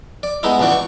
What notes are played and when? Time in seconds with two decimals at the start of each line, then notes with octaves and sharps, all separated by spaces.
0.23 D5
0.43 G#3 B3 D#4 E4
0.59 C#2 C#3 E3 F#4 D5
0.72 C#6